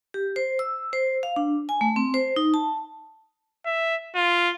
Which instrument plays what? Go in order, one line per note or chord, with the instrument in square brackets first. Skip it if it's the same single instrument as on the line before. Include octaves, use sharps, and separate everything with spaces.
[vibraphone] G4
C5
E6
C5
F5
D4
G#5
A3
C4
C5
D#4
A5
[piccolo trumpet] E5
F4